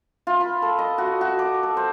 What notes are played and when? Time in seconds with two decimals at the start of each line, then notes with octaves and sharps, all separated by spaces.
0.27 F4
0.41 B5
0.62 A4
0.79 D#5
0.98 F#4
1.21 F#4
1.39 D6
1.63 A4
1.77 C5